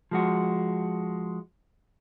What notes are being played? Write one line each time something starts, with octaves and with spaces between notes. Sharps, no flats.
F3 G#3 F#4